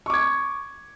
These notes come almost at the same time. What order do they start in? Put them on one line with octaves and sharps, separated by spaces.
C#6 D6 G#6